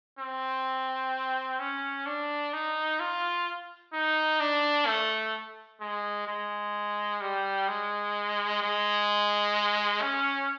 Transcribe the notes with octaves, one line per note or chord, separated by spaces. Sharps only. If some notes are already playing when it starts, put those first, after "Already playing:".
C4
C#4
D4
D#4
F4
D#4
D4
A3
G#3
G#3
G3
G#3
G#3
C#4